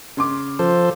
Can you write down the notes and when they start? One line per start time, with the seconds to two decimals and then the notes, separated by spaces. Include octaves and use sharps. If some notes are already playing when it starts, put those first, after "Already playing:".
0.17 C#3 C6 D6
0.59 F3 A4 C5